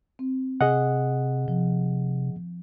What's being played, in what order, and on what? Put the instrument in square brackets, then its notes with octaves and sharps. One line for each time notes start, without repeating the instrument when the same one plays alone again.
[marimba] C4
[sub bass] C3 [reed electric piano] G#4 D#5 F#5
[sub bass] C3 [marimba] F3